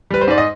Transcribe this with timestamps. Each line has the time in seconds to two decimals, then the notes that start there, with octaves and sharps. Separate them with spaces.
0.11 G3 B4
0.21 C5
0.28 G#2 D5
0.38 D#5